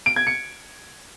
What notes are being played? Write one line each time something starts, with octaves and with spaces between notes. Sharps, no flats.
D7
G#6
C#7